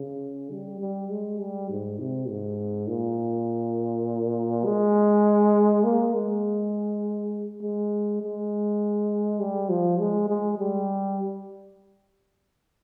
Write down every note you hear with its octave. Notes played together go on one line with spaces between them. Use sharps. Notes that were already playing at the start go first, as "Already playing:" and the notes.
Already playing: C#3
G3
G3
G#3
G3
G#2
C3
G#2
A#2
G#3
A#3
G#3
G#3
G#3
G3
F3
G#3
G#3
G3